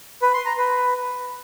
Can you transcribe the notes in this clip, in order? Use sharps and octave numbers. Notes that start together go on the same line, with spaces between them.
B4
C6
A#5
B4